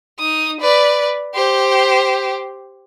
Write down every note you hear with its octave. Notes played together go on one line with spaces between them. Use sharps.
D#4 D#6
B4 D5
G4 C5